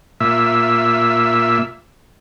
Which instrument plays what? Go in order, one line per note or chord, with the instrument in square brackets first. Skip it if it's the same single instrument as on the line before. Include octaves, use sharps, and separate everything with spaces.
[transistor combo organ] A#2 E5